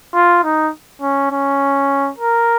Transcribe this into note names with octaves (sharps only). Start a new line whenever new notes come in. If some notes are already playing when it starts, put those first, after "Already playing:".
F4
D#4
C#4
C#4
A#4